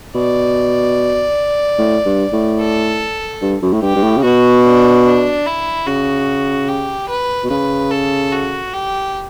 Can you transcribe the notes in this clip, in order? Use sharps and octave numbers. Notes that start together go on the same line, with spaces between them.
B2 D5
A2
G2
A2
A4
G2
F#2
A2
G2 G4
G2
A2
C#3
B2 F#4
D4
D4
E4
C#3 F#4
G4
B4
B2
C#3 B4
A4
F#4
G4